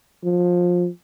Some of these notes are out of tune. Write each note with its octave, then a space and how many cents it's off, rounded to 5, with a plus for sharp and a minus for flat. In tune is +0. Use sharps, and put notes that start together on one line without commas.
F3 +20